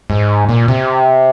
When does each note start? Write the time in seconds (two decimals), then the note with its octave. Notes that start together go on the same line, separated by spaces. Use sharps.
0.10 G#2
0.49 A#2
0.68 C3